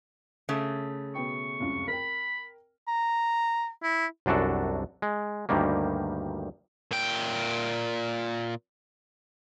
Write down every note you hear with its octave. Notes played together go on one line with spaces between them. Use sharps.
C#3 A3
B2 B3 G5 C#6
F1 C#2 F#2
A#4 G5 B5
A#5
E4
C2 F#2 D4 F#4 A4
G#3
D2 G2 D#3 G3 A#3
A#2 G5